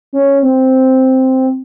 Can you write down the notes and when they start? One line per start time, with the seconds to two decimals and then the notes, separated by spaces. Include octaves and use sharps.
0.13 C#4
0.43 C4